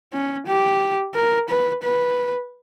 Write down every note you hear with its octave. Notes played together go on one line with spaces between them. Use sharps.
C#4
G4
A#4
B4
B4